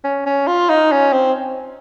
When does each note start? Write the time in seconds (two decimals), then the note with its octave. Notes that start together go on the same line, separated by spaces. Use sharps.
0.04 C#4
0.26 C#4
0.48 F4
0.70 D#4
0.92 C#4
1.13 C4